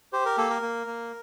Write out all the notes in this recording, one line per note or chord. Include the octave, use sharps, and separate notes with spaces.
G4 C5
A#4
A#3 A4
A#4
A#3
A#3